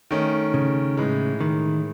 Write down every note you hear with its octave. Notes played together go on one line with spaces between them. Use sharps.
D#3 A3 C#4
C#3
A2 E3 G#3
D#3